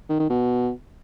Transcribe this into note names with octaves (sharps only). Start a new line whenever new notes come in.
D#3
D#3
B2